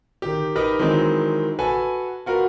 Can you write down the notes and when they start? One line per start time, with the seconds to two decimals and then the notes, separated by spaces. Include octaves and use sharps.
0.22 D#3 G4
0.55 D#4 G4 A#4 B4 D#5
0.79 D#3 E3 F#3 G#3 C4
1.59 F#4 A4 B4 G#5
2.26 F4 F#4 A#4 B4